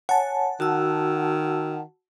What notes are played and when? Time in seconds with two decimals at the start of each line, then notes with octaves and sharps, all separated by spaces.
0.09 C#5 F#5 G#5 A5
0.60 D#3 F#4 E6